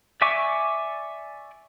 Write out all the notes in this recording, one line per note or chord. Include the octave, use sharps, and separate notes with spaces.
D5 E5 G#5 C#6 D6